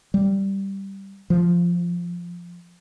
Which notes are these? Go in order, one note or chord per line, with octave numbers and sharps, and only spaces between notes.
G3
F3